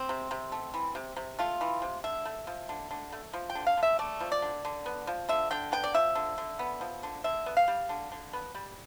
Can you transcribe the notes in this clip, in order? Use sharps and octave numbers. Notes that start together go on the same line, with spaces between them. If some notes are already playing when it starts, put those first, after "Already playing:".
Already playing: C4
C3
C3
A3
E3
C3
C3
A3 F4
E3
C3
D3 E5
A3
F3
D3
D3
A3
F3
G5
D3
F5
D3
E5
A3 D5
F3
D5
D3
D3
B3
F3
D3 E5
D3 G5
B3 G5
D5
F3 E5
D3
D3
B3
F3
D3
D3 E5
B3
F5
G3
D3
D3
B3
G3